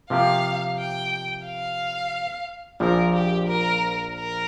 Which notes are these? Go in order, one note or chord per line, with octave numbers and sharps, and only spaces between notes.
C3 F3 A#3 G4 F5
G5
F5
A#1 A#2 F3 A#4
G4
A#4
A#4